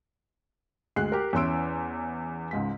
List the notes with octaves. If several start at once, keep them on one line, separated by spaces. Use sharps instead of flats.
D2 G#3 F#6 C7
G4 A#4
E2 E3 C#4 C6 E6 D7
C#2 G#2 B6